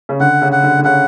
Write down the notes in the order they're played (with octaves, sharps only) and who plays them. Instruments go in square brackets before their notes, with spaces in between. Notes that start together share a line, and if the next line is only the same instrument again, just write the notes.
[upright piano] C#3
[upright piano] D3 [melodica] F#5
[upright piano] C#3
[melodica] F#5
[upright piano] D3
D3
[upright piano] C#3 [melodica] F#5